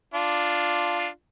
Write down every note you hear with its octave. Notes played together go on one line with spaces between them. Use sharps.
D4 F4